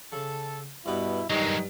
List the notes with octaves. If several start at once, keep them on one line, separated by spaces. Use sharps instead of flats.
C#3 A4
G2 B2 B3 E4
G2 D#3 F#3 G#3 D#4